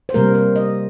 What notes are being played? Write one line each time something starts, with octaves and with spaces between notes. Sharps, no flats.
C5
C3 G3 A#3 A#4
C5
D#5